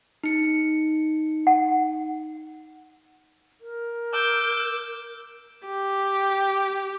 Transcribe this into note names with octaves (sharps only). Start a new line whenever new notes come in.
D#4 C#7
F#5
A#4
D6 E6 G6
G4